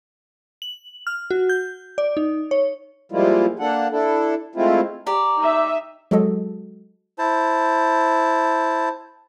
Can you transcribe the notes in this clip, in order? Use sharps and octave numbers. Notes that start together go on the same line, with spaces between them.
F#7
F6
F#4
G6
D5
D#4
C#5
F3 G3 G#3 A#3 E4 F4
A#3 D4 A4 F#5
D4 E4 A4
G#3 A3 C4 E4 F4
G4 D5 A#5
D#4 E5
F#3 G#3 F#4 A4 D#5
E4 C5 A5